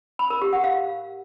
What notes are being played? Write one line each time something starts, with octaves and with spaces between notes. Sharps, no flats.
B5
A#4
G4
F#5
F5